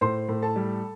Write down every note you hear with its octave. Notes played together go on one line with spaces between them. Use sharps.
A2 C5 C6
A2
A4 A5
G3